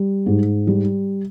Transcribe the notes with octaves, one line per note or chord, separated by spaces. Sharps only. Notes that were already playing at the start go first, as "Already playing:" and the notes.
Already playing: G3
G#2
G3